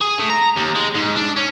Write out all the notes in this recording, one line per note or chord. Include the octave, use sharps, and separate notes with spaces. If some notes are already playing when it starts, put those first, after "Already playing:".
G#4
A2
A#5
D#2
G#3
G#2
D4
C#4